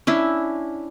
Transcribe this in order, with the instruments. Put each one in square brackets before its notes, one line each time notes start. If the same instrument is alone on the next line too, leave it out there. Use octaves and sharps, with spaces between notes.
[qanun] C#4 D4 E4